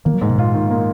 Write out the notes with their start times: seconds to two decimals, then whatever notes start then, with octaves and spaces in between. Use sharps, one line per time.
0.05 D#3 A#3
0.14 F#3
0.21 G#2 G#3
0.29 B2
0.38 A#2 F4
0.54 D#3
0.71 A#3